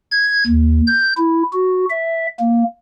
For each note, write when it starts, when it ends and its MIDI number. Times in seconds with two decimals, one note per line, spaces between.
0.12 0.44 92
0.47 0.81 39
0.87 1.13 91
1.17 1.43 64
1.53 1.85 66
1.90 2.27 76
2.40 2.64 58